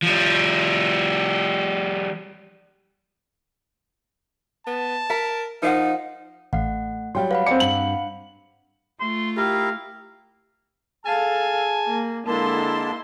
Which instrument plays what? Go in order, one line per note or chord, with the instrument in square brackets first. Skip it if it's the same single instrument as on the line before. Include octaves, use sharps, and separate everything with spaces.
[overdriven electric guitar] F3 G3
[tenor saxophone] B3 [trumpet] A5
[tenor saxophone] A#4 [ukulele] E5 A#5
[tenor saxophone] F3 [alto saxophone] D#4 [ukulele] A#4 F5 F#5
[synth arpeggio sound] A1 F5 C7 [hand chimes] A3 F#5
[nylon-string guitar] F#3 G3 [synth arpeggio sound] F5 G5 C6
[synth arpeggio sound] B4 A6 [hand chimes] F5 F#5 B5
[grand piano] C4 C#7 [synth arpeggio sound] D5 G#5 D6
[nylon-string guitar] G2 [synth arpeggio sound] C7 [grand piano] F#7
[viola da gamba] A3 F4 [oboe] C6
[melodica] E4 A#4 [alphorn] G4 [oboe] F5
[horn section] G#4 G#5 A5 [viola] A4 F5
[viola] A#3
[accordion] D3 G#3 A5 [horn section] A#3 [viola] E4 C6